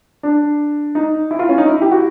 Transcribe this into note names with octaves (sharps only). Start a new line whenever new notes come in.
D4
D#4
E4
F4
C#4
D#4
E4
G4
F#4